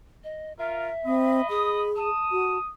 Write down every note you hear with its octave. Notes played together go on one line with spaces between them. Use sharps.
D#5
F4 A#4 E5
C4 D#5 B5
G#4 D#6
A5 D#6
F#4